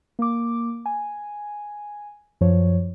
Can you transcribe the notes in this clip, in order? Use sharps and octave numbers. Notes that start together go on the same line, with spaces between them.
A#3 D6
G#5
F#2 F3 C#5